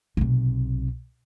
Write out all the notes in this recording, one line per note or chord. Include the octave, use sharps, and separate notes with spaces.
B1 C3